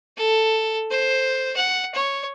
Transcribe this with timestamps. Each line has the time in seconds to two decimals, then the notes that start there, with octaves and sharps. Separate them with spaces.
0.17 A4
0.91 C5
1.57 F#5
1.95 C#5